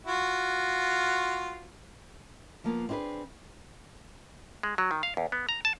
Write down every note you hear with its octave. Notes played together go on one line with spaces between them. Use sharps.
F4 F#4
F3 A#3 B3 F4
C4 D4 E4 G#4 B4
G#3
F#3
D#3
F5
E2
B3
A#5
A5